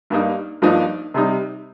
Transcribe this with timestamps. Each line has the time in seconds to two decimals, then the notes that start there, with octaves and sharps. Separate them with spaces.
0.10 G2 G3 A#3 D#4
0.62 G2 F3 A#3 D#4
1.14 C3 G3 D#4